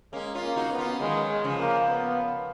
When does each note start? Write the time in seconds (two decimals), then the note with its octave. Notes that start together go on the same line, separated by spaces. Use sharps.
0.13 G#3 A#3 C#4
0.35 C#4 F4
0.42 A#3
0.56 D#4 F#4
0.71 B3
0.78 C#4 F4
1.00 D#3 F#3 G#3
1.30 G#3
1.44 C#3 F3
1.59 A#3
1.88 B3